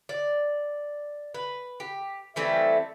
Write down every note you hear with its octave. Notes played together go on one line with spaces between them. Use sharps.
D5
B4
G4
E3 G3 A3 C4